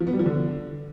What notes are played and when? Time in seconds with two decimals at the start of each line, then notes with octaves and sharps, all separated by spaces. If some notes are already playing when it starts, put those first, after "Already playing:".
0.01 F3
0.07 B3
0.13 G3
0.19 F3
0.26 D3